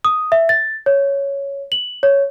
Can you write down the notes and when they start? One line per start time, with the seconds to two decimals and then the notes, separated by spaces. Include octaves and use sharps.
0.05 D#6
0.32 E5
0.49 A6
0.86 C#5
1.72 F#7
2.03 C#5